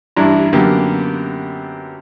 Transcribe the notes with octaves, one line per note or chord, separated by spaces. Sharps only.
A1 G2 D4 E4 A#5
F#2 D3 A#3 B3 G4